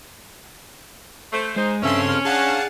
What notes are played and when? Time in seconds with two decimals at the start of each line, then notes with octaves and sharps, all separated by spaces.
1.32 A3 C5
1.56 G#3 D#4 C5
1.82 G2 C#3 C4 C#4 A4 E5 C6
2.08 F6
2.25 D4 G#4 F5 F#5 A5